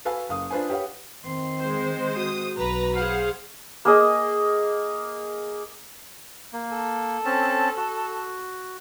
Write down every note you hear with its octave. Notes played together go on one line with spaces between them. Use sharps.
F#4 A4 B4 F5 G#5
F#1 F5 D#6
D4 F4 B4 C5 G#5
G4 B4 C#5 F5 F#5
D#3 C4 C6
G#3 C5
F#4 D#6
B1 B4 A#5
G#4 C5 F5 F#5
A#3 G#4 D#5
A#3
A4
C4 C#4 A5
F#4